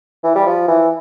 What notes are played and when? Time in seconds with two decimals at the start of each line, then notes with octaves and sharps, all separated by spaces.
0.24 E3
0.35 G3
0.46 F3
0.68 E3